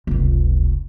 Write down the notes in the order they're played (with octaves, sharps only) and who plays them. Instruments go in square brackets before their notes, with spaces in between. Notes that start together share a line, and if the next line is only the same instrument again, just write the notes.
[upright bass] F1 C#2